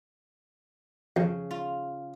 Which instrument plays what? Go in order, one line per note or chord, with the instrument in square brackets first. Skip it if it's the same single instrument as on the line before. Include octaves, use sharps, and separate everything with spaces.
[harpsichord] F2 [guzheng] C#3
[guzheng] F4